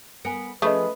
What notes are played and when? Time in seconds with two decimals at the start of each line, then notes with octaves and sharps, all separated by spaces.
0.25 B3 A#4 G#5 C#7
0.62 F3 A3 C#4 G#4 B4 D#5 B5 D#6